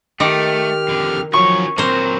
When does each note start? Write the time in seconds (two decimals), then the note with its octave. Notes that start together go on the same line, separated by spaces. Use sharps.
0.20 D#3 A3 G4 D6 F6
0.88 F2 D3
1.33 D#3 F3 F#3 C#4 C#5 C#6
1.78 A#2 F#3 A#3 C4 C5